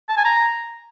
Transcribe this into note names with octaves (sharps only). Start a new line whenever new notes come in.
A5
G#5
A#5